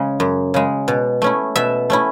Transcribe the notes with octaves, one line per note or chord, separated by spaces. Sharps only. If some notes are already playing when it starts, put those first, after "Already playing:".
Already playing: C#3 G#3
F#2
C#3 G#3
B2
A3 C#4 E4
B2 E5
A3 C#4 E4